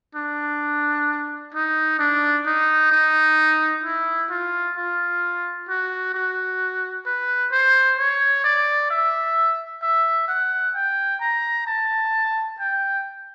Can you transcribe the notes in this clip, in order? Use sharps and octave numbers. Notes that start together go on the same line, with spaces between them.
D4
D#4
D4
D#4
D#4
E4
F4
F4
F#4
F#4
B4
C5
C#5
D5
E5
E5
F#5
G5
A#5
A5
G5